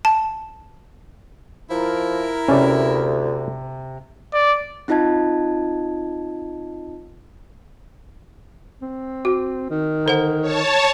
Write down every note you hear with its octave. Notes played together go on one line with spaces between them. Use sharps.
A5
F3 E4 A#4
D2 C3 C#4 D5
D5
C4 D#4 F4 D#5 A5 G#6
C4
F#4
D#3
D3 C5 F#5
C#5 A5